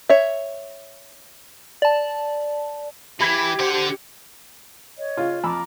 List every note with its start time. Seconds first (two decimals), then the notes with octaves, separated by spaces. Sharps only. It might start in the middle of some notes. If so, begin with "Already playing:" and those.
0.09 C#5 E5
1.82 D5 A5
3.21 E3 G4 B5 G#6 B6
3.59 D3 C5 F#5
4.98 C#5 D#5
5.17 C#3 F4
5.44 F2 A#5 B5 D6 E6